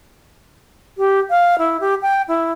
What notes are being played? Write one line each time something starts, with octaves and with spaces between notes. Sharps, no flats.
G4
F5
E4
G4
G5
E4